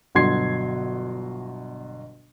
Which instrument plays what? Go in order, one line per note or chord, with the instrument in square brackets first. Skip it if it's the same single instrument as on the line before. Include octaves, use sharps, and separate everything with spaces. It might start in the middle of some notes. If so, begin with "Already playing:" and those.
[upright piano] G1 B2 F#3 C6 G#6 C7